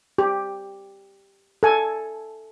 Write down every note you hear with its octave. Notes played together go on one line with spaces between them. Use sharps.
G4
A4 G#5